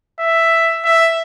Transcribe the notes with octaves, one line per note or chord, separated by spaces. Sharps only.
E5
E5